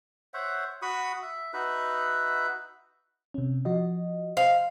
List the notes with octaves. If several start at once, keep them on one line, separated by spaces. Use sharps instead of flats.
C5 C#5 E5 F#5
F#4 B5 C#6 D#6
E5
D#4 F#4 B4 E5
C3 C#4
F3 F#4 D#5
C5 D#5 F5